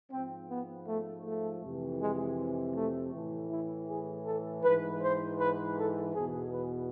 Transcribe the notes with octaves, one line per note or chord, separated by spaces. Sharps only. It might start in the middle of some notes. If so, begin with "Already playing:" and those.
G#2 F3 C4
B3
A3
A3
F2 C3 E3
G#3
A3
A2 E3
E4
G#4
A4
G#2 E3 B4
C5
B4
A4
E2 B2 G#4
B4